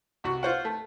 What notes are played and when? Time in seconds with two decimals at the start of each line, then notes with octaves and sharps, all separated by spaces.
0.24 C2 F#4
0.43 F4 C5 F#5
0.65 A3